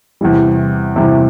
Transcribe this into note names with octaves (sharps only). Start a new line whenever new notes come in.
E2 C3 E3 G3
E2 C3 E3 G3